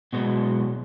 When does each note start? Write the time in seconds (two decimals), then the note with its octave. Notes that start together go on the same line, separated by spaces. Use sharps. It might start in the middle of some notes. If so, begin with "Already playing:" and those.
0.13 B2 F#3 G#3 B3